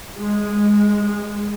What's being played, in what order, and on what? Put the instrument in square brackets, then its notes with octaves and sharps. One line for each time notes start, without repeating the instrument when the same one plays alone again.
[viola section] G#3